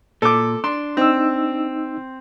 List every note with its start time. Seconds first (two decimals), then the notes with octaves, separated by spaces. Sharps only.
0.22 A#2 A4 D6
0.64 D4 C6
0.97 C4 D#4 E6